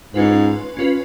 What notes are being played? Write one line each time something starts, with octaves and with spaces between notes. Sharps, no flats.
G#2 C#4 F4 B4
C#4 F4 B4